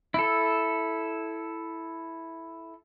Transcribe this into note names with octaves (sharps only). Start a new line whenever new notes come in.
E4 A4